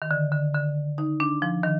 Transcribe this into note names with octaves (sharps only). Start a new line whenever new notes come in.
D#3
D3
D3
D3
D#4
D4
F3
D#3